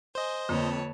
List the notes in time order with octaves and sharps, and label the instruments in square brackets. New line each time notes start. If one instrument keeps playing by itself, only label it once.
[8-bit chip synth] C5 D#5 [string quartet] G#5
[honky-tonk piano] F2 [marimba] D3 A#3 [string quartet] B4 C#5 A5